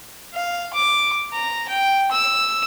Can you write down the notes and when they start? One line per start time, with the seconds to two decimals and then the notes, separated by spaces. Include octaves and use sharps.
0.34 F5
0.74 D6
1.33 A#5
1.69 G5
2.11 E6